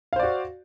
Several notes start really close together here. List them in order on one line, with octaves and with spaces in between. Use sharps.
F5 C5 D5 F#4